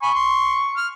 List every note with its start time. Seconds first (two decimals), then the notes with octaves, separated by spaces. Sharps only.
0.02 G#5 B5 C#6
0.14 C6
0.77 F6